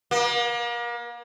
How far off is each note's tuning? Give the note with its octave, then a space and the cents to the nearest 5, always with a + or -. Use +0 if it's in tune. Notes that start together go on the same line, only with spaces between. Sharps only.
A#3 +35